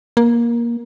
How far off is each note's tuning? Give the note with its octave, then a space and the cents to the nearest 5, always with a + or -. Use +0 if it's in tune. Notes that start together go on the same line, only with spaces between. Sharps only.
A#3 +15